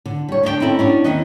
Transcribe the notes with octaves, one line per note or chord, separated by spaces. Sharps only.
D3
G3 C#5
D3 D4 D#5 G5
C4 C#4 D#4 E4 A4
C#4 D4 F#4
D#2 D#3 C4 E4 D#5 F#5